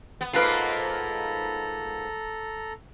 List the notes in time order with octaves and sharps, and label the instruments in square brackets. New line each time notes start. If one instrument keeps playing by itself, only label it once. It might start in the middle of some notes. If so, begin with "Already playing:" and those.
[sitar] B3
[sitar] G#2 A#3 B3 [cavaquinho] F4 B4 F5 [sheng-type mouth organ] A4 A#5